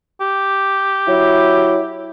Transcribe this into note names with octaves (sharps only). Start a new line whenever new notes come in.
G4
F#3 E4